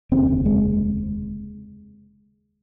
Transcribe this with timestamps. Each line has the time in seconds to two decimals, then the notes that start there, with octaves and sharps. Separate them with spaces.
0.12 F1 D#2 C#3 C4
0.46 G#3